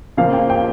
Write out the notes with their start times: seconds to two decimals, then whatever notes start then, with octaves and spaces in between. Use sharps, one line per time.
0.17 C#3 F3 A#3 F5
0.33 G5
0.50 G5